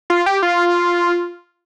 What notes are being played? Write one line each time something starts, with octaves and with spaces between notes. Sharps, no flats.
F4
G4
F4